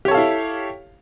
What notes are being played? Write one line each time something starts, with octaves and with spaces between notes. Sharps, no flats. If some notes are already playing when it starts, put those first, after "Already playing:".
E4 G4 A4 C#5 F5